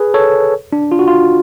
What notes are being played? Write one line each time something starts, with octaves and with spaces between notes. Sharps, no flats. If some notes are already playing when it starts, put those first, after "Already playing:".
Already playing: G#4 B4
A4 C#5
D4
F4
F#4
F4